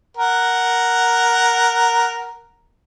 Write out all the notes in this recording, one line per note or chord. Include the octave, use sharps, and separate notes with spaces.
A#4 F#5